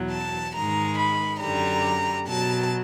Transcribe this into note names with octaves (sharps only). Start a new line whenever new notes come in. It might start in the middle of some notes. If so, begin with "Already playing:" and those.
Already playing: E2 B2 F#3
A5
G#2 D#3 G#3 A#5
B5
F#2 D3 G3 A#5
B2 F#3 A5